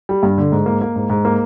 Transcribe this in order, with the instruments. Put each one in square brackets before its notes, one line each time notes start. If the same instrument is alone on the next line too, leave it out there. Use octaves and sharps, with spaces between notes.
[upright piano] G3
G2
D3
G#2
A#3
A#3
G#2
G#2
A#3